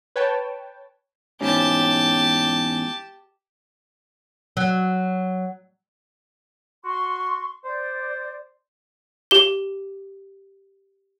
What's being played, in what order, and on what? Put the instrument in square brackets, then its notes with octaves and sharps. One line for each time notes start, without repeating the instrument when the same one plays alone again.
[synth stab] B4 C#5 G5 A5
[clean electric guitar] E2 G#2 C#4 [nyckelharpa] G4 A5
[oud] F#3
[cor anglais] F#4 [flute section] C6 C#6
[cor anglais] C5 [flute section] D5
[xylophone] G4 G7